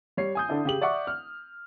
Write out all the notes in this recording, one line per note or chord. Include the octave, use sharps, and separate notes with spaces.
G3 C#5 C7
G#5 D#6 G6
D3 D4 E4
C#3 G4 F#7
D5 E5 F#5 C#6 D6
F6